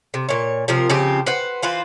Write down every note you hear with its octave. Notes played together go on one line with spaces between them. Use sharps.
C3
A#2 C#5
C3 F3 F4 A#4
C#3 F3 C4 G4
B4 C5 F#5
E3 F4 B4 C5